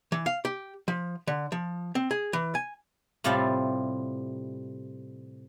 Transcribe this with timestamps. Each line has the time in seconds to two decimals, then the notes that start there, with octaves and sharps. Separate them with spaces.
0.12 E3
0.26 F5
0.45 G4
0.88 F3
1.27 D3
1.52 F3
1.95 C4
2.11 G#4
2.33 E3
2.55 G#5
3.24 A2 C3 G3 E4 F4 A5